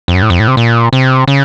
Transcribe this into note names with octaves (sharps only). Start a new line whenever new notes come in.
F2
F#2
A2
F2
A2
C3
A#2
C3
C#3